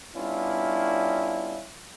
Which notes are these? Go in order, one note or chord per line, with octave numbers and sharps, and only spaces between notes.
G3 B3 C#4 D4 E4 F4